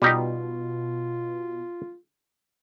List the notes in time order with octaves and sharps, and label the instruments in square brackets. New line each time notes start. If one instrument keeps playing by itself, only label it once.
[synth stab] B2 [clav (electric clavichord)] G3 D#4 G4 [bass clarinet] F4